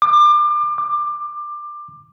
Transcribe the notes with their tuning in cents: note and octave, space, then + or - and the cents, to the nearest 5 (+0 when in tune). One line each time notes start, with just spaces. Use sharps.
D6 +30
D6 +20